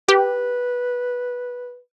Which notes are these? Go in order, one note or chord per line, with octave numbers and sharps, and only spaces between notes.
G4 B4